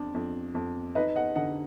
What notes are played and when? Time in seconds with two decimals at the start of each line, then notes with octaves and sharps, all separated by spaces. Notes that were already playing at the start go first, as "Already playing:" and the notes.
Already playing: F2 D4
0.14 F2
0.55 F2
0.95 D#4 B4 D#5
1.15 D#5 F#5
1.36 D3 D#5 F#5